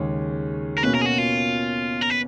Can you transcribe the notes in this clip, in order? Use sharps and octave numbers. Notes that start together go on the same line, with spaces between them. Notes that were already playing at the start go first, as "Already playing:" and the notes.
Already playing: D#2 C#3 G#3 C#4
A#4
B2 A#3 C#4 B4
A#4
G#4
F#4
F4
A#4
B4